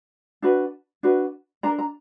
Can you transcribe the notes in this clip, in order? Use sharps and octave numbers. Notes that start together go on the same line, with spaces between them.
D4 F#4 B4
D4 F#4 B4
D4 A#4 A#5
A#5